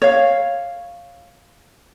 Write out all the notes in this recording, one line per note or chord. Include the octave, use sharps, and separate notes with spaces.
C#5 F5